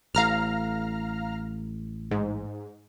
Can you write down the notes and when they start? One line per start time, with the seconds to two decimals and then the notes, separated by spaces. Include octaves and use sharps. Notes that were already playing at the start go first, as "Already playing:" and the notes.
0.15 A1 A2 F5 A#5 F6
2.11 G#2